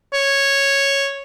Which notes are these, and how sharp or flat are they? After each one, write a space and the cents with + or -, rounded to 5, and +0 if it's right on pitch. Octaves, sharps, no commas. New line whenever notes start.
C#5 -5